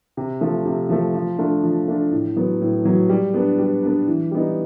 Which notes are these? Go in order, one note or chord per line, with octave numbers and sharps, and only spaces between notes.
C3
F3 A3
C3
F3 A3
F3
A3 D4 F4
F3
A3 D4 F4
A2
F#3 B3
A2
F#3 B3
G3
B3 D4
G3
B3 D4
E3
G3 B3 D#4